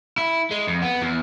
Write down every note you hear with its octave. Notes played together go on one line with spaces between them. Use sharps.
E4
G#3
F2
B3
E2